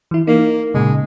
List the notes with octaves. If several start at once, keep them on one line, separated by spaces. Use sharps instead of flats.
E3 E4
A#3 D#4
A#2 C#3 G#3